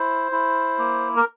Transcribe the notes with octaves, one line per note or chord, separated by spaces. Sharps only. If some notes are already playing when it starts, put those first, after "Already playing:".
Already playing: E4 C5
E4
A#3
A#4